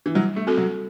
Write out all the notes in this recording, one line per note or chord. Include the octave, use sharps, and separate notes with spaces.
E3
F#3 G3
A3
C4 F#4 A4
F#3